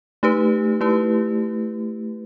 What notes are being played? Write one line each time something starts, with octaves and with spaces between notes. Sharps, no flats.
A3 D#4 G4 B4
A3 E4 G4 B4